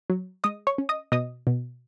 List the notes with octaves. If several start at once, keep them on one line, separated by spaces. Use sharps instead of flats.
F#3
G#3 D#5 D#6
C#5 C#6
C#4
D#5 D#6
B2 D#5 D#6
B2